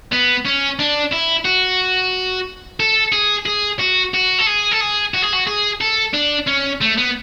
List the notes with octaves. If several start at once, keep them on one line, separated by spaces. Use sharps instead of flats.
B3
C#4
D4
E4
F#4
A4
G#4
G#4
F#4
F#4
A4
G#4
A4
G#4
F#4
G#4
F#4
G#4
A4
D4
C#4
A3
B3